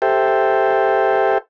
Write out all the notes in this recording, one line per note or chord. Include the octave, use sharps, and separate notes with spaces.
G4 A4 C5 E5 G5